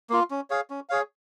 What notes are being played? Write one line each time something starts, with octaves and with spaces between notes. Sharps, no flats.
A#3 F4
C#4
G#4 C#5 F5
C#4
G#4 C#5 F5